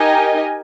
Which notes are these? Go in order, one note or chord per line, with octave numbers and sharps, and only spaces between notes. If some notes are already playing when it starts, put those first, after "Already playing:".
Already playing: D#4 G4 A#4 D#5 G#5